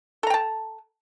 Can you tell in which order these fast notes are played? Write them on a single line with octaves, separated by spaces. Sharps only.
A4 A#5 G5 A5